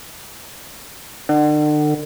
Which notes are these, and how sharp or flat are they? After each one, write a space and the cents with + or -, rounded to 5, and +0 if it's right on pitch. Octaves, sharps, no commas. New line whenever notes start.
D3 +40